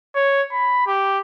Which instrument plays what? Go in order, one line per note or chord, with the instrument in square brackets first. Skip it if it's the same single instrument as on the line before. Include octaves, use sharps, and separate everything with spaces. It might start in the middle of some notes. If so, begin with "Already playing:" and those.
[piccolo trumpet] C#5
B5
G4